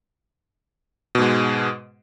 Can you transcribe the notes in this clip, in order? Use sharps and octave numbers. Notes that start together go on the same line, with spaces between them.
G#2 B2 G#3